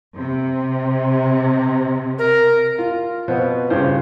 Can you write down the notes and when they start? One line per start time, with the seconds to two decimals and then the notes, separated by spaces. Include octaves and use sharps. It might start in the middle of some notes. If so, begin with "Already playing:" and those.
0.16 C3
2.18 A#4
2.79 F4
3.28 B2 F3 B3 C4
3.70 G2 C#3 F4 C5